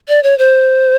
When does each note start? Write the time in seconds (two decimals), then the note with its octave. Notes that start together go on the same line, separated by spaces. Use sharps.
0.08 D5
0.23 C#5
0.38 C5